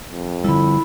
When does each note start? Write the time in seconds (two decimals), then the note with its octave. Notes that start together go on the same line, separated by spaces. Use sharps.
0.12 F2
0.44 D3 G3 E4 B5